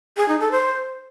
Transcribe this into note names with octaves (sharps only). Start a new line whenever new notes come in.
G#4
D#4
A4
C5